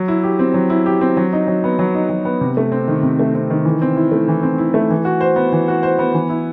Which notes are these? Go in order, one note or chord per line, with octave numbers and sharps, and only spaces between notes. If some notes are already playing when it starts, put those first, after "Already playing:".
Already playing: F#3
E4
G4
C4
F#3
E4
G4
C4
F#3
D#4
F#3
B3
F#3
D#4
F#3
B3
C3
A3
C4
D#3
C3
A3
C4
D#3
E3
C4
E4
A3
E3
C4
E4
A3
E3
F#4
C5
B3
E3
F#4
C5
B3
E3
E4